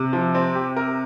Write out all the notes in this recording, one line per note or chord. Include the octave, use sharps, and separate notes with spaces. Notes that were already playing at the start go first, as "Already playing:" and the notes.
Already playing: C3
F3
C4
G4
A#4